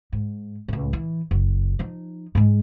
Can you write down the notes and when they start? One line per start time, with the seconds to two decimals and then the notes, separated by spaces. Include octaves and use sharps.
0.12 G#2
0.68 C#2 A2
0.93 E3
1.31 F#1
1.79 F3 D#4
2.35 G#2 G#3